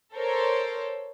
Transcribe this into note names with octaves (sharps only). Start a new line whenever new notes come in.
A4 A#4 C5 C#5